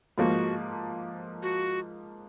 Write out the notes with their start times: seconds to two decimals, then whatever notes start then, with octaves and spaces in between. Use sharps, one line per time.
0.17 G#2 F3 A#3 F#4
1.42 F#4